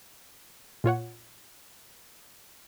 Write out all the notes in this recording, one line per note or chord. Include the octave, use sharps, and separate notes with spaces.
A#2 F4 C#5 F#5